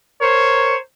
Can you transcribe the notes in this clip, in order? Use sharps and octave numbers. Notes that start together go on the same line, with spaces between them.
A#4 C5 C#5